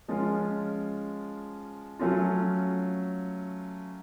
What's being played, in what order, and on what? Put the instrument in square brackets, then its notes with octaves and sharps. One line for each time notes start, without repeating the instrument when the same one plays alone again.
[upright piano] F3 G#3 C#4 F4
F#3 A3 C#4 F4